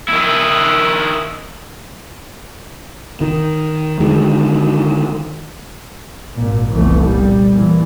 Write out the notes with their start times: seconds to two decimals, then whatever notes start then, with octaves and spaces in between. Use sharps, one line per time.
0.09 D#3 E4
3.21 D#3
4.00 D3 D#3 G#3
6.36 G#1 A#2
6.72 F1 C2 E3 A3 B3
7.05 A#2 G3
7.54 A#2 E3